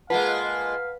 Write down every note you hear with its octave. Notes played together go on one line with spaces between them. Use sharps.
G#3 A#3 F4 B4 F5 F#5 A5